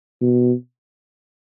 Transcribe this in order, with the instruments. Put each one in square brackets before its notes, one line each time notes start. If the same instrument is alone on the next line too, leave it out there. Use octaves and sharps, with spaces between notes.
[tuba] B2